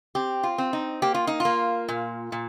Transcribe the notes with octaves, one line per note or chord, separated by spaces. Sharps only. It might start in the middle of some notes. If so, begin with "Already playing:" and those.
C4 G4
F4
C4
D#4
A#3 G4
F4
D#4
A#3 F4
A#2
A#2